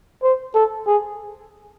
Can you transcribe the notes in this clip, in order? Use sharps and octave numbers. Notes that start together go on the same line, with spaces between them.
C5
A4
G#4